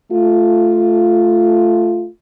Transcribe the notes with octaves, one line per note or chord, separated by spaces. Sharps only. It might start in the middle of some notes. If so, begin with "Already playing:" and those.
A3 F4